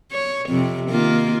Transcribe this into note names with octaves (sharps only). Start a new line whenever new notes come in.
C#5
F2 C3
D#3 A#3 F4